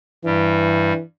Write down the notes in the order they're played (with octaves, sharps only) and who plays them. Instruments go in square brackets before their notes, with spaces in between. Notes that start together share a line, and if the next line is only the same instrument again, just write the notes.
[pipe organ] G2 G3 [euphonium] E3